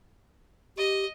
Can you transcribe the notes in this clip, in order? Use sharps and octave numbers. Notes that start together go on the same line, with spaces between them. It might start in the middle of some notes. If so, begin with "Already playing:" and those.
G4 D#5